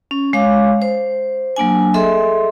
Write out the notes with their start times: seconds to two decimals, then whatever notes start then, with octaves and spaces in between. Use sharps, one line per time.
0.11 C#4
0.33 G#3 C#5 F5 D6
0.82 C5
1.56 F#3 A#3 D4 G#5
1.94 G#4 A4 D#5 E5 C6